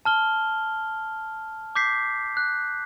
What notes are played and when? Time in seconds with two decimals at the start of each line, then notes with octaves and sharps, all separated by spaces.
0.05 A5 F6 G7
1.75 D6 G6 B6 C7
2.37 F#6